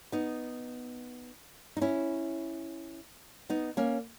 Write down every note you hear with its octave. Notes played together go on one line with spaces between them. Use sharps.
B3 D#4
D#4
C#4 E4
B3 D#4
A#3 C#4